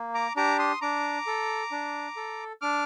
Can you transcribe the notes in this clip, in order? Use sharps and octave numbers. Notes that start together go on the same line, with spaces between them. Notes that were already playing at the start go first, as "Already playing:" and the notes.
Already playing: A#3
A#5 D6
D4 G4 A#5 D6
C6 D#6
D4 A#5 D6
A4
D4
A4
D4 D6 F6